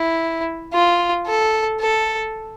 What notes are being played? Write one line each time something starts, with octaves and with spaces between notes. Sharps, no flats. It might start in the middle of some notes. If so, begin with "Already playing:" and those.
Already playing: E4
F4
A4
A4